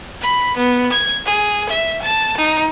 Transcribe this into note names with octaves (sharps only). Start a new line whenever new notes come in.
B5
B3
G#6
G#4
E5
A5
D#4